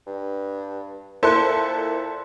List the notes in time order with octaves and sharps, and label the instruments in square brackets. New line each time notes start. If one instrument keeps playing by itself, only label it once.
[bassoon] G2
[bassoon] A#2 [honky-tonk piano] E4 A4 C5 [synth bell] A#4 C6 F#6